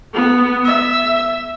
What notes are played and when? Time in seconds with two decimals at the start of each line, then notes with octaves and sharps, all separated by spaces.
0.14 B3
0.65 E5